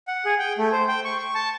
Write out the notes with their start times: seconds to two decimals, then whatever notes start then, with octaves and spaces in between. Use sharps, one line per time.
0.07 F#5
0.25 G#4
0.39 G5
0.58 A3
0.72 C5
0.88 G5
1.05 C#6
1.19 C#6
1.35 A5